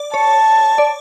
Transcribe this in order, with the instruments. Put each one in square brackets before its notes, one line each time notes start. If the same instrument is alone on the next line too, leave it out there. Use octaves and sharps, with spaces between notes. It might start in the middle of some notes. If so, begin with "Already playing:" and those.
Already playing: [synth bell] D5
[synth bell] C#5 [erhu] A5
[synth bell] D5